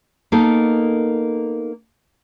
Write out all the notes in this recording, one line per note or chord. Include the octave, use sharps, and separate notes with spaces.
A#3 B3 D#4 A4